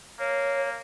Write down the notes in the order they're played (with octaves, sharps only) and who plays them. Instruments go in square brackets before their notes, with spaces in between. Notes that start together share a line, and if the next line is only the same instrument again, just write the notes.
[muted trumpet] A#3 [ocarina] C#5